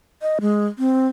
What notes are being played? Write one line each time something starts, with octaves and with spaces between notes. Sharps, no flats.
D#5
G#3
C4